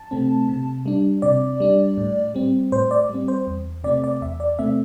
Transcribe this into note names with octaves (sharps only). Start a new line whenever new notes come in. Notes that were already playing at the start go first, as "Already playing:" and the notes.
Already playing: A5
C3 A3 C4
C3
G3 D4
C3 D5
G3 D4
A2
G3 C4
A2 C5
D5
G3
C4
C5
E2
C3 A3 C4 D5
D5
E2 E5
D5
C3 A3 C4 E5